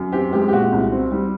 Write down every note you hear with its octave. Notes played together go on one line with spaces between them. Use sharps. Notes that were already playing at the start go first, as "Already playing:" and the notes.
Already playing: F#2
C4 G4
G#3 G4
G4
A#2 F#4
C2
C4
G3